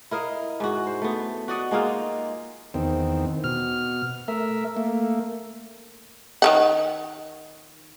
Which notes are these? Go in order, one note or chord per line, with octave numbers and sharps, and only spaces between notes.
E4 A#4 D#5 F5
G#2 F#4
C5
A3 B3
F#4 D5 D#5 F#5
G#3 A#3 D#4 F4
E2 D#3 C4
B2 F6
A3 A#4 E5
A3 A#3
D#3 E3 F#5